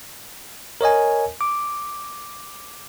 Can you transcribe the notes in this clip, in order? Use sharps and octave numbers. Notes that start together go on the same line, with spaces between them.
A#4 C#5 D#5 G#5
D6